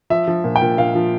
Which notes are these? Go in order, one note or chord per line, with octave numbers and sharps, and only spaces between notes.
F3 E5
F3
A#2
G5
A#2
A#2 F5
F3